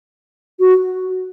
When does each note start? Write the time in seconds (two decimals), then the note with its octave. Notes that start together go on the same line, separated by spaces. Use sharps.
0.60 F#4